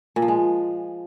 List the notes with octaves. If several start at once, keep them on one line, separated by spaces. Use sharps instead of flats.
A#2
F3
G#3